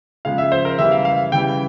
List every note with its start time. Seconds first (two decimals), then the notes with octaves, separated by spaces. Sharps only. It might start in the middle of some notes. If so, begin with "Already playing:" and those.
0.25 C#3 F3 G#3 F5
0.38 E5
0.52 C5
0.65 A#4
0.78 C#3 E3 G3 E5
0.92 F5
1.05 F5
1.32 C#3 E3 G3 G5